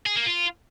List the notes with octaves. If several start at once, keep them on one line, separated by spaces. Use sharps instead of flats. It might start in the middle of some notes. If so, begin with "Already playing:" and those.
G#4
A#3
F4